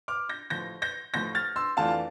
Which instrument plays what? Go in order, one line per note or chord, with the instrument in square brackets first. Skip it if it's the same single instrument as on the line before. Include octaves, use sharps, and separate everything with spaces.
[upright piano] D6 F6
G6 A#6
A1 A2 F3 G6 A#6
G6 A#6
A1 A2 F3 G6 A#6
F6 A6
C6 E6
F2 E3 A3 D4 F4 F5 A5